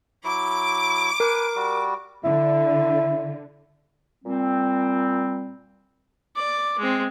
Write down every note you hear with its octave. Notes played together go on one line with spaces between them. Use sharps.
F#3 E4 D6
A#4 B4 G#5
G3 F#4
D3 E4
A#2 G3 C4
D5 D6
G#3 C4